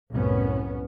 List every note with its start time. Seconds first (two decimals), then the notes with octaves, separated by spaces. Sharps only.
0.13 C2 F#2 A2 B3 C#4